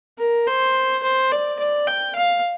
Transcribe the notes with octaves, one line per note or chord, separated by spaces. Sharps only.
A#4
C5
C5
D5
D5
G5
F5